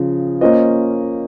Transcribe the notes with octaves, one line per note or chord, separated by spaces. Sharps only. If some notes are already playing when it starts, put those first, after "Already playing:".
Already playing: C#3 F3
A#3 C#4 F4 C5 D#5